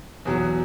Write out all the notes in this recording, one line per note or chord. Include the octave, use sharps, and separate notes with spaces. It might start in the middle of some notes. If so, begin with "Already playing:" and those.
E2 B2 F#3